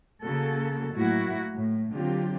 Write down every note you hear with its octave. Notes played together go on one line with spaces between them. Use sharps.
C#3 A#3 F#4 A4
A2 F#3 A#3 E4 F#4
A2
D3 F#3 C4 F4 G4